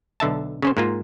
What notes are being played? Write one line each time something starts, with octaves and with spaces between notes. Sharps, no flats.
B1 D3 E5 A5
C#3 C#4 C5
G#2 A#3 F4